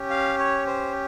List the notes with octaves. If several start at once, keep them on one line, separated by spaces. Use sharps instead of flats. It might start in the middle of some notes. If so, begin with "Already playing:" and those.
Already playing: C#4 G4
F5
C#5
C5